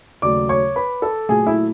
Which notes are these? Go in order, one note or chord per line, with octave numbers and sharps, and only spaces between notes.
D#2 C#3 F#3 A3 D5 D6
C#5 C#6
B4 B5
A4 A5
A#2 F#3 A3 G#4 G#5
E4 E5